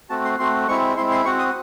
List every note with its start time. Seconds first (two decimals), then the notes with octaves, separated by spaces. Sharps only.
0.10 A3 C4 F#4 A5
0.24 C6
0.39 A3 C4 F#4 C6
0.67 G#3 C4 E4 C#6
0.97 G#3 C4 E4 C6
1.11 C6
1.25 C4 F#4 C#6
1.39 D#6